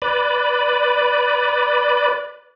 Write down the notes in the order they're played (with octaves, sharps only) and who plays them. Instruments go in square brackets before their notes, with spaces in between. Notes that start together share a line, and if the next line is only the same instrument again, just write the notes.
[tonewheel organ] B4 D5